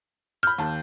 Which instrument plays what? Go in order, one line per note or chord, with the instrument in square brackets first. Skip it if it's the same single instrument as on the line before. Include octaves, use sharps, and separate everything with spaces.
[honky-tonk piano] B5 G6 [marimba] F6
[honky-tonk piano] D#2 A5